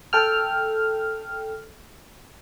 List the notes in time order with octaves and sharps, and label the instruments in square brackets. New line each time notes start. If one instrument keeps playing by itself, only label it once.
[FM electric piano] A4 G5 F6